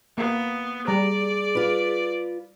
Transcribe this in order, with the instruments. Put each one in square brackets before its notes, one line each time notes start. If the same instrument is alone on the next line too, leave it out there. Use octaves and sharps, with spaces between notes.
[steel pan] A#3 [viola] B3
[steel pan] G3 A#5 [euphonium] G#4 [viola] D5
[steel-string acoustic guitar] F4 B4